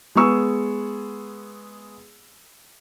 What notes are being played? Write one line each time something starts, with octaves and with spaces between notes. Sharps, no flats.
G#3 B3 G#4 C#6 E6